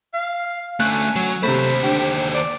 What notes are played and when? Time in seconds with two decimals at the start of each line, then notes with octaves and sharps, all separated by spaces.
0.14 F5
0.80 D3 A3 C#4 F#6
1.16 F#3
1.43 D#2 C3 A3 C5 B5
1.83 D3 G4
2.35 D5